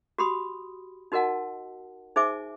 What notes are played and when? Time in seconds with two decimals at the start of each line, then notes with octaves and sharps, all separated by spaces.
0.18 F#4 G4 B5 C6 D#6
1.12 D#4 F#4 A#4 D#5 F#5 A5
2.16 D#4 G#4 C5 E5 G#5 D6